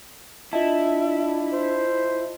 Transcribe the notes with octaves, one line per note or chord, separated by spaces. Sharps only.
D4 E4 F4 D#5 A5
C5